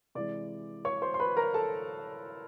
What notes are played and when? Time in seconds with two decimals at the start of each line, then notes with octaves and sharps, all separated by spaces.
0.15 C3 E3 G#3 D5 D6
0.85 C#5 C#6
1.02 C5 C6
1.14 C6
1.20 B4 B5
1.37 A#4 A#5
1.54 A4 A5